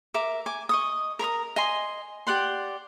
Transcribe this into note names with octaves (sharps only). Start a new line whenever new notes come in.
A#4 E5 D6
G#5 D6
D#5 C#6 D#6
A#4 A#5 B5 D#6
D#5 G#5 C6
G4 D5 F#5 C6